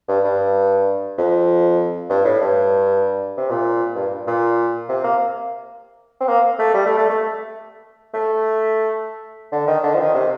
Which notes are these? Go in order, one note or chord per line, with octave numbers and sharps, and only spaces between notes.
G2
G2
F2
G2
A2
G2
C3
A#2
G2
A#2
C3
A#3
C4
A#3
A3
G3
A3
A3
A3
A3
D3
D#3
D3
F3
D#3
C3